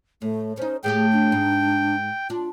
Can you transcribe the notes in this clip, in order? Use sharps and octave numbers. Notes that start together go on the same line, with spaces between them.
A2 A3
C#4 D#4 C5
A2 A3 G4 G#4 G5
D4
G#2
D4 F4